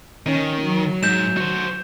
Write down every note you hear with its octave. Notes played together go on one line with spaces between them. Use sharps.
D#3 C#4
F#3
G#2 G6 E7
F#4 C5